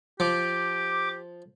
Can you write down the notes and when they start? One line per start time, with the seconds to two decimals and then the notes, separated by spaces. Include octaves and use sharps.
0.20 F3 G4 D6